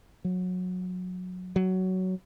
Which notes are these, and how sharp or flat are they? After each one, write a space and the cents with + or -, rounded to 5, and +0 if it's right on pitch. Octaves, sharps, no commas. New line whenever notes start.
F#3 -20
F#3 +10